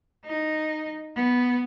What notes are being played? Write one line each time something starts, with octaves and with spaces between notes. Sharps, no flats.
D#4
B3